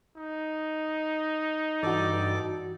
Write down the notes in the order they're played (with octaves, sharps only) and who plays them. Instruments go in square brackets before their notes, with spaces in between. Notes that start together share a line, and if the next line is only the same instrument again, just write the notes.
[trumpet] D#4
[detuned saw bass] G2 [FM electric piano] E3 F#4 [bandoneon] A4 D5 D6